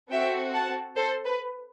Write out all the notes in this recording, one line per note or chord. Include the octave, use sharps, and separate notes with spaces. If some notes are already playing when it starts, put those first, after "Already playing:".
C4 F#4 A4 E5 G5
F#5 A5
A4 C5
B4